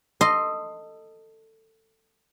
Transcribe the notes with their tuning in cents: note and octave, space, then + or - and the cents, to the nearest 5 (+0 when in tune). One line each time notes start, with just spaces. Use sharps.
A4 +20 D#5 -5 C6 +0